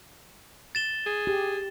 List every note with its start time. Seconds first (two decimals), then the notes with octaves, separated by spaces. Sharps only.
0.75 A6 E7 G7
1.06 G#4
1.27 G4